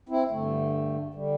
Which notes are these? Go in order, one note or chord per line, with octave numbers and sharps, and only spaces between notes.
C4 E4
G2 D3 A3
D3 G3